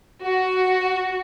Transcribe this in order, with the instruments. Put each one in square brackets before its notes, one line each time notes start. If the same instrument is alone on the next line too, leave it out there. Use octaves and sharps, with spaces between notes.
[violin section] F#4